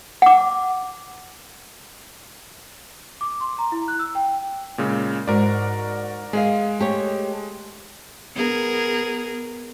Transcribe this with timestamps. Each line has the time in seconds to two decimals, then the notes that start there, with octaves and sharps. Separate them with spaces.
0.22 F#5 D6
3.21 D6
3.40 C6
3.58 A#5
3.72 E4
3.88 F#6
3.99 E6
4.15 G5
4.78 A#2 C#3 G#3
5.27 G#2 F#4 A#4 D5
6.33 G#3 G#4 D#5 F5
6.79 A3 G4 C#5
8.35 B3 G#4 A#4